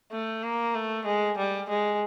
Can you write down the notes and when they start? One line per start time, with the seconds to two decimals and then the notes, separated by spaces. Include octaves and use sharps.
0.12 A3
0.43 A#3
0.75 A3
1.06 G#3
1.38 G3
1.69 G#3